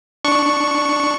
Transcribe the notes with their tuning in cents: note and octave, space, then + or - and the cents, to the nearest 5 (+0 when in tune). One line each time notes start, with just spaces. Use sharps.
D4 +0 C#6 +0